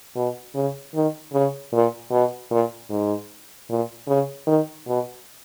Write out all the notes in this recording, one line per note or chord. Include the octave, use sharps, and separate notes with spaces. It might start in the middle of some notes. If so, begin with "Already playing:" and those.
B2
C#3
D#3
C#3
A#2
B2
A#2
G#2
A#2
C#3
D#3
B2